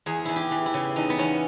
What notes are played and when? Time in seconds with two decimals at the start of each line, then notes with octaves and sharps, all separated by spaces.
0.06 E2 G#4
0.25 E2 E4
0.36 G4
0.51 E3
0.66 E4
0.74 C#3
0.96 E2 D#4
1.10 B3
1.18 E2 C#4